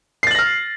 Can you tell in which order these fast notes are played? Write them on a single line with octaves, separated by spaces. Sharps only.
C7 A6 F#7 A#6 F6